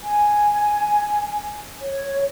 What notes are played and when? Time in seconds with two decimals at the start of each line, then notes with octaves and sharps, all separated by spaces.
0.03 G#5
1.80 C#5